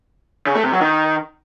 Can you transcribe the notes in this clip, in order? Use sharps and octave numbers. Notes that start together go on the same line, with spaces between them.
C#3
A3
C3
F#3
D#3